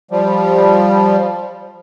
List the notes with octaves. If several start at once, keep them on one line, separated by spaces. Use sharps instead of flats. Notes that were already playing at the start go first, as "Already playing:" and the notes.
F3 G3